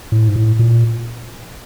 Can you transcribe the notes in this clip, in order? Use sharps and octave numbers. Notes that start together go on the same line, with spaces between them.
A2
G#2
A2
A#2